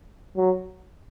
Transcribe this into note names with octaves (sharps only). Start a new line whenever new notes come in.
F#3